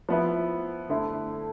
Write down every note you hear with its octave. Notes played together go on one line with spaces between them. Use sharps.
F3 B3 E4
D3 A3 E4